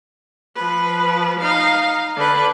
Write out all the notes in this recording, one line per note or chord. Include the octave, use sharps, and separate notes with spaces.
F3 B4
D#4 F5
D3 B4